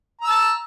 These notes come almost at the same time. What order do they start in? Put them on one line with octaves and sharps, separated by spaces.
A#5 E6 A5